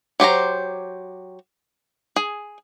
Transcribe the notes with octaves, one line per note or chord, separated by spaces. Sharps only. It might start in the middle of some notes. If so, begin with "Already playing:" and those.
F#3 G4 C5 A#5
G#4